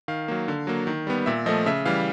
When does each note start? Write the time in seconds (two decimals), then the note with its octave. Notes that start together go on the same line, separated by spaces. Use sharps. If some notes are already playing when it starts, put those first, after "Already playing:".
0.08 D#3 F5
0.28 F#3 A#3
0.48 D3
0.67 F#3 A#3
0.87 D#3
1.07 G3 B3
1.26 A#2 E5
1.46 F3 A3 D#5
1.66 C#3 E5
1.85 E3 G3 F5